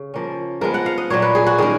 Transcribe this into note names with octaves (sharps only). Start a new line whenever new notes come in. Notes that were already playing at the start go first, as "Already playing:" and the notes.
Already playing: C#3
F3 A#3 C#4
F3 G#3 B3 A#4
F#5
F5
D#5
A#2 F#3 A#3 C#5
B4
G#4
F#4
D#3 A#3 C#4 G#4